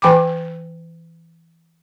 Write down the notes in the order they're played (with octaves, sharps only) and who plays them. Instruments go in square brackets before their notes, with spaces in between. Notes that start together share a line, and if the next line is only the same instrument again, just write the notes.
[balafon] E3 G5 G#5 B5 D6